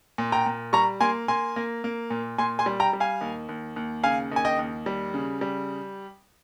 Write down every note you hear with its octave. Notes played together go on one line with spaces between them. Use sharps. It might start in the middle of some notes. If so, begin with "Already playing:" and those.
A#2
G5 A#5
A#2
G3 A#5 C#6
A#3 G#5 C6
A#3 G#5 C6
A#3
A#3
A#2
A#2 G#5 C6
G#5 C6
G3
G5 A#5
G3
F5 G#5
D#2
D#2
D#2
C#3 F5 G#5
D#2 G#5
D#5 G5
D#2
G3
C#3
G3